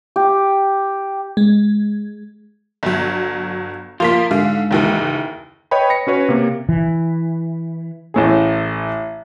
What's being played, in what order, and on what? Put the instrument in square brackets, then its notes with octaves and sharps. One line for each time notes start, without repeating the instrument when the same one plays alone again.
[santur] G4
[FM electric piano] G#3
[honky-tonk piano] G1 F#3
[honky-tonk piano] F3 A#3 B6 [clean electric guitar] F4
[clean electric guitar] G#2 [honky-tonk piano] D3 F5
[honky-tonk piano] F#1 D#2 E3
[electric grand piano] B4 C#5 D#5 G5 B5
A#6 C#7
C#4 F#4 B4 C#5
C3 A#3
[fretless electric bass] E3
[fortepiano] A1 A2 G#4